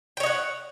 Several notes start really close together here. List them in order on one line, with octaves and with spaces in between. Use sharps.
G5 C#5 D#5 F#5